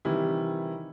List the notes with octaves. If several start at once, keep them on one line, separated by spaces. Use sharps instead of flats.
C3 D#3 E3 G3 E4